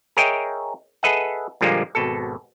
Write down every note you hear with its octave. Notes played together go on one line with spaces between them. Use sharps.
G#4 A#4 C#5 D#5 E5 G5
G#4 A4 B4 D#5 E5 F#5
A#2 D3 F3 G3 G#3 A#3
G#1 B2 A4